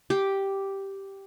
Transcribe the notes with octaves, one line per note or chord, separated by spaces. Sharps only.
G4